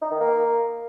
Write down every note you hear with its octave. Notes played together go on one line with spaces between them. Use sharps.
D#4
D#3
A#3